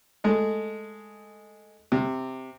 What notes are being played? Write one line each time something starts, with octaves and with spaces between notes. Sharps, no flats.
G#3 A3
C3